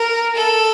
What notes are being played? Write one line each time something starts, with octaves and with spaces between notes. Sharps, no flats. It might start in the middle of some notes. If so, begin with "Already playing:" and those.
Already playing: A#4
A4